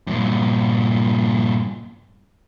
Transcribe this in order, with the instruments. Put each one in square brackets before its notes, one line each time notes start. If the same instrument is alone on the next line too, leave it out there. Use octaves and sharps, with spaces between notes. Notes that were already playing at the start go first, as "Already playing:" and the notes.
[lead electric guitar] G2 A#2